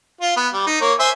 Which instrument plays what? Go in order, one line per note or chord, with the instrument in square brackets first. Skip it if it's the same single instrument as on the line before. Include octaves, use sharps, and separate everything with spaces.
[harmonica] F4
B3
G3
D#4
A#3 C#5
C5 E5 G#5